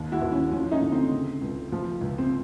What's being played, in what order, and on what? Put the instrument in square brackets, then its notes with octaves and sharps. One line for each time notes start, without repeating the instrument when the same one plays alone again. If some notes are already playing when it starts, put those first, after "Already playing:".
Already playing: [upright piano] D#2
E4 F#4
D#2
C#4
F3 C#4
C#4 D#4
D3
C4
C#3
C#2
F3
C#2
C4